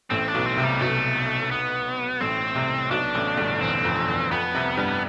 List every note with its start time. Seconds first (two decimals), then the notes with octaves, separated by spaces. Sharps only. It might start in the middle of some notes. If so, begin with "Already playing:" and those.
0.10 A1 A2 C4
0.28 D4
0.34 B1 B2
0.46 C4
0.57 C2 C3
0.64 G3
0.80 B1 B2 A3
1.51 B3
2.21 A1 A2 C4
2.55 C2 C3
2.90 B1 B2 D4
3.15 A1 A2
3.37 G1 G2
3.61 E2 C4
3.85 F2
3.99 F2
4.08 E2
4.31 F2 B3
4.55 C2 C3
4.77 G2 G3